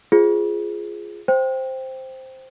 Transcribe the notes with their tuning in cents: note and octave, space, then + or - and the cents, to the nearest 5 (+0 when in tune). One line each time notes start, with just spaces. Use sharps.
F4 -10 G#4 +0 C5 +0
C5 +0 G5 +0